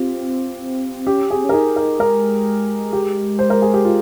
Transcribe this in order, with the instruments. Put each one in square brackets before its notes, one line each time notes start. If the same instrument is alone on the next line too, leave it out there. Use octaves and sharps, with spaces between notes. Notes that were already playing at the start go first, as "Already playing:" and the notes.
Already playing: [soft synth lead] C4 [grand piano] F4 G4
[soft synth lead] C#4 [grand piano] G4
[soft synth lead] C4 [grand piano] G#4
[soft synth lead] C#4
[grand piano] A#4
[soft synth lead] D#4 [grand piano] G#4
[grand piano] A#4
[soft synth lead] G#3 [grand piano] A#4
[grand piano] G4
C5
A#4
G#4
G4
F4